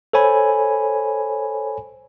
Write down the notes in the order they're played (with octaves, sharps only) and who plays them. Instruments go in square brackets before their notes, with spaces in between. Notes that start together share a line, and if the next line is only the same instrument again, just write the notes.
[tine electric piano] A4 C5 C#5 G#5 B5